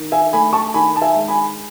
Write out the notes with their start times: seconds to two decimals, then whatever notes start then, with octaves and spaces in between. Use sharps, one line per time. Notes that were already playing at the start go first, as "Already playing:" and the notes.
Already playing: D#3
0.12 E5 G#5
0.33 A3 G#5 B5
0.53 A5 C#6
0.74 D#3 G#5 B5
0.96 A5
1.01 E5 G#5
1.15 G#3
1.28 G#5 B5